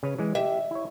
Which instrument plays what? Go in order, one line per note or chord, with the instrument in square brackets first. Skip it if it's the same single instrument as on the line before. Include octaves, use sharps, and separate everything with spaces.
[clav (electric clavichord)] C#3 B4 C#5
E3 G#3
[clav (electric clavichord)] G4 [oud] E5
[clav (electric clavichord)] E4 C#5